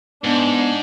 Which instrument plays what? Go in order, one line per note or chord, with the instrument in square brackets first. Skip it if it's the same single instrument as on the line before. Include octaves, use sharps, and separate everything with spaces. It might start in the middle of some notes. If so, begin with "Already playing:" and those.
[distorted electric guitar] G#2 [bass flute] B3 [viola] D4